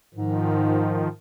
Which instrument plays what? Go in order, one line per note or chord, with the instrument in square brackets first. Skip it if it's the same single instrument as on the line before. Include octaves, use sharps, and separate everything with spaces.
[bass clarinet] G#2 [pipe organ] D#3 F3